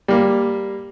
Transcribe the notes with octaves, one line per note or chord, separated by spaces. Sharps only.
G3 A#3